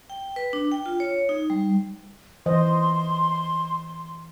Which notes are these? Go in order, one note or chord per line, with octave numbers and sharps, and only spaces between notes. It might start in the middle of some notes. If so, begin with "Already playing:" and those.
G5
B4
D4
G5
F4
C#5
D#4
G3
E3 C5 D#5 C6